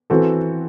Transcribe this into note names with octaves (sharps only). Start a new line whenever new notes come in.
E3 C4 F#4 A4